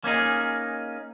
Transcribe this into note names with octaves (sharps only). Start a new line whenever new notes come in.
A#3 C#4 D#4 G#4